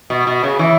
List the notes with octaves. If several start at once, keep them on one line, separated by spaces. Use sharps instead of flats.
B2
B2
C#3
E3